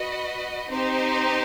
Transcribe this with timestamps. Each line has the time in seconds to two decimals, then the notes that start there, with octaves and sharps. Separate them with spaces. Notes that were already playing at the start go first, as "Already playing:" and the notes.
Already playing: F#4 B4 D#5
0.69 C4 D#4 G4 C5